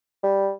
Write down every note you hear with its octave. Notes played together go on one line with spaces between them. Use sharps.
G3